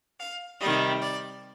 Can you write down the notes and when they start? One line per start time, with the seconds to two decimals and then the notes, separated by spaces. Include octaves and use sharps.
0.20 F5
0.60 C3 D#3 G3 D#5
1.02 D5